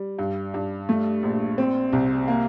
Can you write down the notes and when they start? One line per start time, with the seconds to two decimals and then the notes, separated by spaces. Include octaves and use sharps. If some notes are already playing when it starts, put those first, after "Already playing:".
Already playing: G3
0.19 G2
0.54 G2
0.89 A3
1.23 A#1
1.58 C4
1.93 C2
2.28 A#3